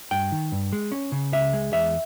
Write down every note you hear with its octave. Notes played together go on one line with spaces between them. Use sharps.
G2 G5
D#3
G2
G#3
C#4
C#3
C#2 E5
G#3
E2 E5